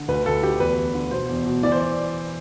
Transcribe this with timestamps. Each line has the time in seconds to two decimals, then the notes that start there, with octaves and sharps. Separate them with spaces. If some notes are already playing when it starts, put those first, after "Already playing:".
Already playing: D3
0.08 D2 B4
0.26 D2 A4
0.42 D2 G4
0.60 E2 B4
0.77 E2
0.94 D3
1.11 B2 C5
1.29 E2
1.46 B2
1.63 E3 D5
1.72 C5
1.81 D5